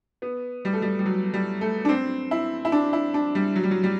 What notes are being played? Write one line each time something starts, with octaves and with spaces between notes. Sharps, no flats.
B3
G3
A3
G3
G3
F#3
G3
A3
D4
C4
E4
E4
D4
E4
D4
G3
F#3
G3
F#3
G3